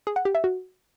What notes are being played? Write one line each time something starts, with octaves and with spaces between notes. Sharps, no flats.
G#4
F#5
G4
E5
F#4